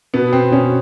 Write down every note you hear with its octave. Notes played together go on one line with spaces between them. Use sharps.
B2 B3
C4
B2 C#4